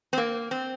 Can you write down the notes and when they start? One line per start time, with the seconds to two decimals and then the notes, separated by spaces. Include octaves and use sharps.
0.13 C4
0.18 A#3
0.51 C4